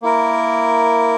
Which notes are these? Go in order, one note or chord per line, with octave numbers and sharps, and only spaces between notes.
A#3 E4 A#4